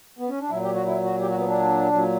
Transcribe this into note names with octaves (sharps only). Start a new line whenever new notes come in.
B3
C#4
D4
A#2 F#3 E4
G4
F#4
E4
F#4
G4
F#4
B3
D4
A#2 F#3